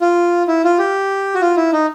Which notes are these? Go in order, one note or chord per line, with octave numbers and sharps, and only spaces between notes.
F4
E4
F4
G4
F#4
F4
E4
D#4